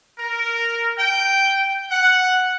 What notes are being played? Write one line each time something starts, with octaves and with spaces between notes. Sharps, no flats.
A#4
G5
F#5